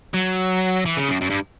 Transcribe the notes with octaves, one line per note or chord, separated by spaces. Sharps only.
F#3
E3
C#3
F#2
F#2
G2